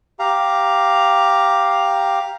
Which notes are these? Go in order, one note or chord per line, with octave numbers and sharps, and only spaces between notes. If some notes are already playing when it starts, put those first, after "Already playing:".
G4 F5 A#5